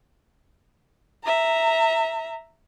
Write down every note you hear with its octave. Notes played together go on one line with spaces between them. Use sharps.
E5 A#5